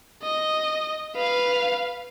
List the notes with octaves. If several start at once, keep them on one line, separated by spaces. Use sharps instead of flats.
D#5
B4 F5